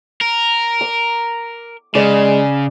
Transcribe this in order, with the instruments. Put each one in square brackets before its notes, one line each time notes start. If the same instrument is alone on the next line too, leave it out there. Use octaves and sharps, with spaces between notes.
[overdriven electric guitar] A#4
[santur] D6
[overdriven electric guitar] C#3 [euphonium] G#3 [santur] D5